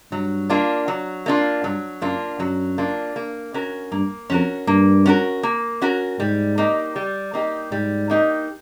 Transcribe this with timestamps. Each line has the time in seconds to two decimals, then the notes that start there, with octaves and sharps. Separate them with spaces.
0.12 G2 F#3
0.50 A#3 D4 F4
0.88 F#3
1.26 A#3 D4 F4
1.64 G2 F#3
2.02 F#2 A#3 D4 F4
2.40 F#2 F#3
2.78 A#3 D4 F4
3.16 A#3
3.54 C#4 F#4 A#4
3.92 G2 A#3
4.30 F2 C#4 F#4 A#4
4.67 G2 A#3
5.06 C#4 F#4 A#4
5.43 A#3
5.82 C#4 F#4 A#4
6.19 G#2 G3
6.58 A#3 D#4 G4
6.96 G3
7.33 A#3 D#4 G4
7.71 G#2 G3
8.10 A#3 D#4 G4